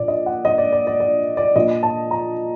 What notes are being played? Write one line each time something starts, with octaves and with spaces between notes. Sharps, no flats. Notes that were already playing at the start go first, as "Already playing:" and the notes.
Already playing: A#2 D5
D#5
F#5
D#5
D5
D5
D5
D5
D5
A#2 D#5
A5
A#5